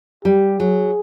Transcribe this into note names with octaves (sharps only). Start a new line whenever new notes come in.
G3 G4
F#3 G#4